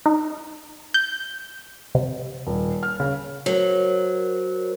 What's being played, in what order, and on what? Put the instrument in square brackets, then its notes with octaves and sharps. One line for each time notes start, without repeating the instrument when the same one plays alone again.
[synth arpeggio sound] D#4
G6
C3
[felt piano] D#1
F6
C#3
[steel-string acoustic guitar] F#3 [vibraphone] A#4 C5